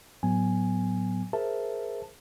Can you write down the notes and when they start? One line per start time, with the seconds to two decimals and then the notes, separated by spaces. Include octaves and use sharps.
0.23 A2 F#3 B3 G#5
1.33 G#4 A#4 C5 E5 A5